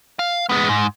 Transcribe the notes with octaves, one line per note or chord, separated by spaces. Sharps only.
F5
G#3 B3
G#2